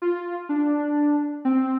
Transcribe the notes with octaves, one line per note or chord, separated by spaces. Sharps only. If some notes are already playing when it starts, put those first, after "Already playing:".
F4
D4
C4